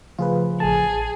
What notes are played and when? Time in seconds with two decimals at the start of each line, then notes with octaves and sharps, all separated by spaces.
0.19 C#3 F3 A3 F4 G#4 B4
0.60 A1 G#4 A5